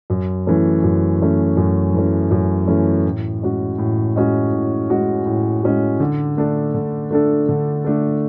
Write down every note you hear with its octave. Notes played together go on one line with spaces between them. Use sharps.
F#2
E3 A3 C#4
F#2
E3 A3 C#4
F#2
E3 A3 C#4
F#2
E3 A3 C#4
A2
G#3 C#4 F#4
A2
G#3 C#4 F#4
A2
G#3 C#4 F#4
A2
G#3 C#4 F#4
D3
A3 D4 A4
D3
A3 D4 A4
D3
A3 D4 A4